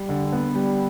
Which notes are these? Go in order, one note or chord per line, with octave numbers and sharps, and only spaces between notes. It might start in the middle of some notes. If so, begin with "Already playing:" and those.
Already playing: G3
D3
B3
G3